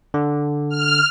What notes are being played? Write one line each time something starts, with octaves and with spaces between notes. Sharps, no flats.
D3
F6